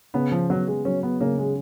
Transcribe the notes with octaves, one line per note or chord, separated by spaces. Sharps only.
C#3 B3
F3
F#3 B3
G#3
F#3 C#4
B3
C#3 A#3
G#3